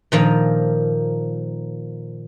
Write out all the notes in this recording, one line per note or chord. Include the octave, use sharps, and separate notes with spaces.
A#2 D#3 F3